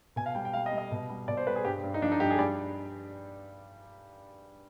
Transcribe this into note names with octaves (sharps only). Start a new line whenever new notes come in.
B2 G#5
F5
G3 G5
G5
G3 F5
D#5
G3
D#5
B2
G3
B2 D5
C5
G3 B4
G#4
G2 G4
G2
D#4
F3 D4
D#4
G2 G4
G#4
G3 D5